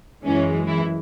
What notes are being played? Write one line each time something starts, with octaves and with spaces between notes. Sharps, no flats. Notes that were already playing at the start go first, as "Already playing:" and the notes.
F#2 E3 G#3 C#4
E3 E4